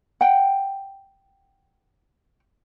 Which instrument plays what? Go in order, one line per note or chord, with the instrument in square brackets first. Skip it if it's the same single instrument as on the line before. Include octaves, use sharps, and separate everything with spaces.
[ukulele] F#5 G5